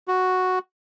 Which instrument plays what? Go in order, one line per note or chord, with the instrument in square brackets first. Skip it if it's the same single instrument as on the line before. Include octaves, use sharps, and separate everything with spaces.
[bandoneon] F#4